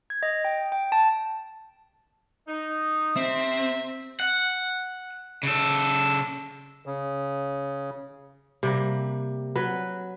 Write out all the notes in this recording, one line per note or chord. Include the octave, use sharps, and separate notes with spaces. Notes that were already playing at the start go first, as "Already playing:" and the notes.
G#6
D#5
G5
G5
A5
D#4
C3 C4 E5
F#5
C#3 A4
C#3
C3 G3 A#3
F#3 B4